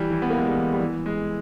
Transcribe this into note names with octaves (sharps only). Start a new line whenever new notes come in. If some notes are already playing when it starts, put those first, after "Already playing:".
Already playing: E3 G3
E3
B3
A#3
G#3
G3
E3
G3
E3
G#3